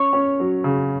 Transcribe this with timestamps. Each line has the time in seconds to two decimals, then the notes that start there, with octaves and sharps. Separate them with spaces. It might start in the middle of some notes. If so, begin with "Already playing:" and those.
Already playing: C#4 C#5 C#6
0.13 C#4
0.40 F#3
0.64 C#3